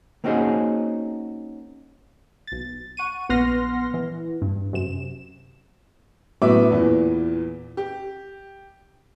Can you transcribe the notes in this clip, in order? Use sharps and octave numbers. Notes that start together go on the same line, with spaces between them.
A#3 C4 C#4 D#4 F#4 G#4
B1 A6
F#5 C#6 D#7
A#1 B3 F#5 C6 F6 A#6
E3
G2
F#2 C3 E7
A2 F#3 B3 E5 D6
E2 A#2 E3
G4